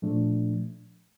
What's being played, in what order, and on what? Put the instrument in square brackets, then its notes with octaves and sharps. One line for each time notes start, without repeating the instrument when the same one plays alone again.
[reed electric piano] A#2 F3 A3 D4